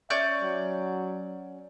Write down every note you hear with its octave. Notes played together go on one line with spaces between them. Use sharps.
C#4 D5 E5 G6
F#3